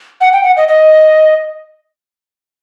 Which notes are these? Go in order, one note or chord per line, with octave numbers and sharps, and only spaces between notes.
F#5
G5
F#5
D#5
D#5